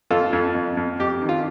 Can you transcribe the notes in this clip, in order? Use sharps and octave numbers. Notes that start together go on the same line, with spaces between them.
F2 F4 A4
F2
F2
F2
F2 G4
D#3
F4